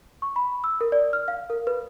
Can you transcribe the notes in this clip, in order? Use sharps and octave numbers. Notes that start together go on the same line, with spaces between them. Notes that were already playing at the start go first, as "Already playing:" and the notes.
C#6
B5
E6
A#4
D5
F6
F5
A#4
B4